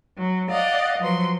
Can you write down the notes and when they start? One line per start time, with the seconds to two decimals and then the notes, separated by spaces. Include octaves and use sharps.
0.18 F#3
0.50 D5 D#5 F5 F#5
0.99 F3 F#3 B4 C6